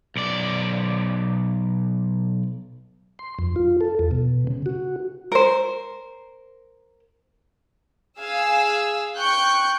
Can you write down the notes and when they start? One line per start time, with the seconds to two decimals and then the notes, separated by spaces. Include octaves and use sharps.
0.16 B1 D5
3.19 C6
3.39 F2
3.56 F4
3.81 A4
3.99 E2
4.11 B2
4.47 C#3
4.66 F#4
5.32 A#4 C5
8.19 G#4 F5 G#5 E6
9.18 G5 C#6 F#6 G6